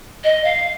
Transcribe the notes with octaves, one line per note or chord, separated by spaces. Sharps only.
D#5
F5